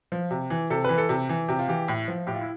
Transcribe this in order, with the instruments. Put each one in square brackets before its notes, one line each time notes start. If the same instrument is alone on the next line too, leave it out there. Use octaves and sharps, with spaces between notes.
[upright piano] F3
C3
E3
C3 A4
E3 B4
A4
C3
E3
C3 G4
F4
E3 G4
A2
F3
A2 G4
F4
E4